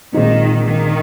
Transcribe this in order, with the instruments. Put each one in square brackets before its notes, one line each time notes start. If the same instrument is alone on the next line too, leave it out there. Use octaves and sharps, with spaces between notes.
[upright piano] A#1 A#2 G#3 C4 D#4 [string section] D#3
[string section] D#3